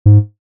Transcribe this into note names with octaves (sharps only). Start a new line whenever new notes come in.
G#2